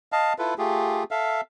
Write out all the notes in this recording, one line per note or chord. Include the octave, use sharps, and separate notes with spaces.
D#5 F5 A5
E4 F4 A4 B4
A3 F4 G4 G#4
A4 E5 F5